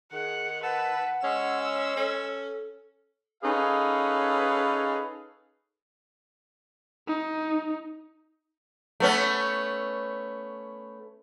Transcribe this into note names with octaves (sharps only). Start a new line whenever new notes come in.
D#3 G#4 F#5
B4 F#5 A5 E6
G#3 C#4 G#4 C#5 E6
C#4 A4
C#4 D#4 G#4 A4 B4 F5
D#4
A3 B3 C#4